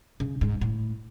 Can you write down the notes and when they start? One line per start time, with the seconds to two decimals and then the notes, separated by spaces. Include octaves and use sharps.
0.20 C#3
0.41 G#2
0.61 A2